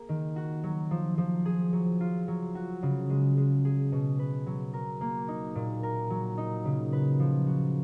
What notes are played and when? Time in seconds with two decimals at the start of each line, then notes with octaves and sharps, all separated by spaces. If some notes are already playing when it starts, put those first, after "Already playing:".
Already playing: A#3 G#4
0.09 D#3
0.36 F#4
0.64 F#3
0.91 F3
1.18 F3
1.45 G#4
1.73 F#3
2.00 F4
2.28 F#3
2.55 F#4
2.83 C#3
3.10 G#3
3.37 G#3
3.65 G#4
3.92 B2
4.19 B4
4.46 F#3
4.73 A#4
5.01 A#3
5.28 D#4
5.55 A#2
5.83 A#4
6.10 F#3
6.38 D#4
6.65 C#3
6.93 B4
7.20 F3
7.47 F#4